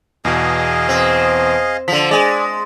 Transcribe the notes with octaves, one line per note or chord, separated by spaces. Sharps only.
E2 B2 G#4 D#5 F5
C4
D3 F3 B6
G#3 D5 G#5 A6